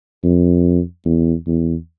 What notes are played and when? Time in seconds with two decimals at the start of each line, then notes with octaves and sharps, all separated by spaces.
0.24 F2
1.05 E2
1.47 E2